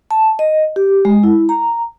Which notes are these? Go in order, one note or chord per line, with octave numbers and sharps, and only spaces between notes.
A5
D#5
G4
G#3
E4
A#5